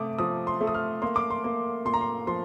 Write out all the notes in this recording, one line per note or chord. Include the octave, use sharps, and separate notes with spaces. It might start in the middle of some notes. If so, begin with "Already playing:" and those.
Already playing: C3 A3 D6 D#6
F3 D#6
C6
A3
D#6
F6
A#3 C6
D6
C6
A#3
A#2 C6
A#5
C6
F3 C6